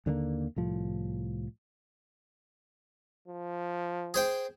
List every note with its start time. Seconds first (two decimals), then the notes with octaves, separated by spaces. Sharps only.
0.06 D#2 D3 G#3 A#3
0.56 C2 A2 F3
3.27 F3
4.14 G#4 C5 G5